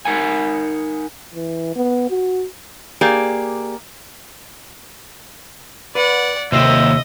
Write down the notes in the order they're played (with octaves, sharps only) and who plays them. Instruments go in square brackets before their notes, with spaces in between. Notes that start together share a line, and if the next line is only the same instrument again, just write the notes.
[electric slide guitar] D#4 A#4 F#5 G#5
[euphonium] E3
B3
F#4
[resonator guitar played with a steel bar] A#3 G4 G#4 D5
[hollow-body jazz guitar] B4 [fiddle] D5 F#5
[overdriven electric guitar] D#2 C4 [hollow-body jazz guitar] C3 C5 [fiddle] D#5 [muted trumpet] E5